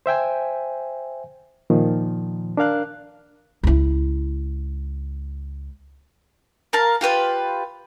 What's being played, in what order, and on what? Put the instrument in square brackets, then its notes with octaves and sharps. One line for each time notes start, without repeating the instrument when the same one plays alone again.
[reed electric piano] C5 E5 G5 G#5
A#2 D#3 F3
D4 A#4 F5 F#6
[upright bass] C#2 E4
[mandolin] A#4 F5 A5
F4 G4 B4 G5